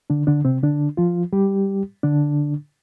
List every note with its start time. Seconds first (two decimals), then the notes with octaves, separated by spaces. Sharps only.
0.10 D3 D4
0.27 D3 D4
0.45 C3 C4
0.63 D3 D4
0.97 F3 F4
1.33 G3 G4
2.04 D3 D4